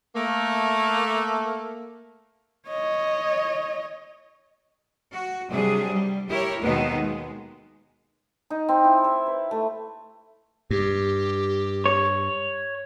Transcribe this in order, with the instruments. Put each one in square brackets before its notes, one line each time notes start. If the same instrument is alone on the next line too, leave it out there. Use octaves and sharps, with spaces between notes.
[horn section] A3 A#3
[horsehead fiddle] C#5 D#5
[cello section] F#4
C3 F#3 G3 D4 G#4
G3
E4 G4 A#4 C#5
D#2 B2 D#3 G#3 B3 D#4
G#3
[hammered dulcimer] D#4
C4
E4
E5
B4
A3
[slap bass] G2 [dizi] G4
[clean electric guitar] C#5